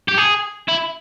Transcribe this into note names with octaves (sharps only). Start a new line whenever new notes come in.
G4
G#4
E4